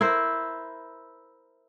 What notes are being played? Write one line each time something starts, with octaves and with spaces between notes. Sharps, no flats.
E4 A#4 C5